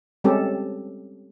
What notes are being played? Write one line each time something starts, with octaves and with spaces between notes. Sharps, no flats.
G3 G#3 C4 C#4 G4 A4